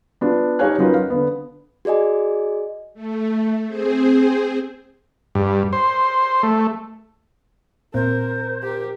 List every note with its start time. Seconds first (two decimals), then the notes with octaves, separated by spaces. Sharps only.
0.21 B3 D4 F4
0.59 D#4 G4 C#5 F5 G#5 F#6
0.78 F#3 C#4 D#4 F4 A#4 B4
0.94 F5
1.10 D3 B3
1.85 F#4 G#4 D5 D#5 G#5
2.94 A3
3.67 C4 G#4 C5
5.35 G2
5.73 C5
6.43 A3
7.94 A#2 C4 A#4 C5
8.63 G4 A#4